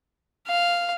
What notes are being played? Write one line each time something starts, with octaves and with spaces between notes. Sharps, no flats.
F5